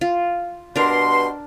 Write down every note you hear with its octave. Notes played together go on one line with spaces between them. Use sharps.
F4
G2 B2 D4 A#4 C6